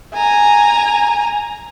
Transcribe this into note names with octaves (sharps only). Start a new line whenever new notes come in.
G#5 A#5